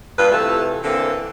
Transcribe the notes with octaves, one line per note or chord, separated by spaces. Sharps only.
G2 A#2 F4 B4
C3 E3 A3 F4 A4
D3 E3 A#3 C4 A4